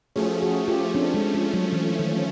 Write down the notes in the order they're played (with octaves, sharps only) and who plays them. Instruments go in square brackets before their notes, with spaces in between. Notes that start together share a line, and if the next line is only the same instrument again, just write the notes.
[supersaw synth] F3 A3 C#4 [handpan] F#4 G#4
[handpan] F#4 G#4
F4 G4
C4 D4
G#3
G#3
F#3
E3
D#3